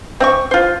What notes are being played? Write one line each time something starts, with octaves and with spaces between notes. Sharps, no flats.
C4 E5 C#6
F4 C5